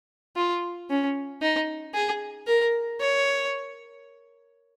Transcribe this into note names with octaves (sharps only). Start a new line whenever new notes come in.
F4
C#4
D#4
G#4
A#4
C#5